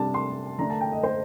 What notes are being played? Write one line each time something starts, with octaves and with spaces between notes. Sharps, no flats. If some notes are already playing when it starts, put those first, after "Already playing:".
Already playing: C3 G3 D4 A5
C6
D3 A3 D4 A#5
A5
G5
D#5
C5